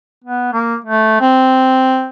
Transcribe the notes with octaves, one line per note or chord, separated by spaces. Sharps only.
B3
A#3
A3
C4